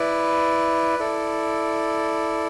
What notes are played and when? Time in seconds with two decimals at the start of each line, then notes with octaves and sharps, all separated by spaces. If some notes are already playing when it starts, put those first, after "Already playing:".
Already playing: E4 B4 D5
0.99 E4 A4 D5